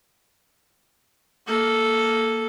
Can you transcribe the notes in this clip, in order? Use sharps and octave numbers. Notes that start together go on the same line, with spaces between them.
A#3 A4